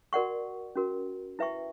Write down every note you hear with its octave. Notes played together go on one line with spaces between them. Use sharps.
F#4 A#4 D5 F#5 C#6
C#4 F#4 A#4
E4 B4 E5 G5 C#6